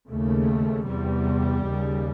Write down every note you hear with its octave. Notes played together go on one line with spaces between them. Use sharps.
D#2 C#3 A3
E2 C3 G3
D#2 C#3